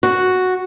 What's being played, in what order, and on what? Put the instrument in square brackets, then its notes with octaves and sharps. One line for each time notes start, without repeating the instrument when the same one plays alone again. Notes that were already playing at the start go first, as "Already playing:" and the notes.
[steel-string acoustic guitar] F#4